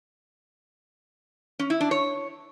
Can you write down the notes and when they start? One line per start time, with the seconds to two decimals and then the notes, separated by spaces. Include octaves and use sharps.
1.59 C#4
1.70 E4
1.81 D4
1.91 C#5